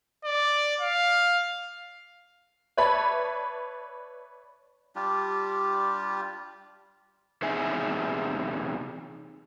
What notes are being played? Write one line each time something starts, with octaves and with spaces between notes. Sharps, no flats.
D5
F5
B4 C#5 D5 E5 A5 B5
G3 D4 F4 G4
E2 C3 D#4 G#4 E5 G#5